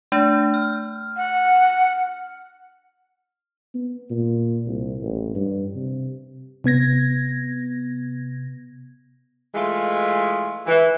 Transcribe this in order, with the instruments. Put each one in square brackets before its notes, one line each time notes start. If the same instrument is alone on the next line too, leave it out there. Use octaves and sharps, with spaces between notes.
[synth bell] A3 D4 G6
F6
[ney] F#5
[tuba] B3
A#2
C2
A1
G2
C3
[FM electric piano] C3 B3 G#6 A#6
[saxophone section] E3 G#3 A3 F4
E3